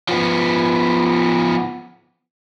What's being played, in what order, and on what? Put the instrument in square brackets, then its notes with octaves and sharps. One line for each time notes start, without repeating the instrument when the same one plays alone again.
[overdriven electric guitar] F3 B3